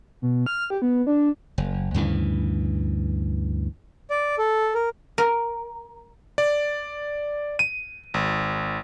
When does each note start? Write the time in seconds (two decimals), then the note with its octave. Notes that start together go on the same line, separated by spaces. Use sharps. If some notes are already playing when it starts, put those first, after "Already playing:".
0.22 B2
0.46 F6
0.70 G4
0.82 B3
1.07 D4
1.58 F#1
1.94 D2 G2 C#3 E3
4.10 D5
4.38 A4
4.75 A#4
5.18 A#4
6.38 D5
7.59 D#7
8.14 G#1